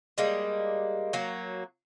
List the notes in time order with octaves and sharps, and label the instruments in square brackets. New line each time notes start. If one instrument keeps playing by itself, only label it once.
[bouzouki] G3 G#3 A#3
F#3 A#3